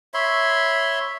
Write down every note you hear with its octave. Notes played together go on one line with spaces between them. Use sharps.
C#5 E5 B5 C6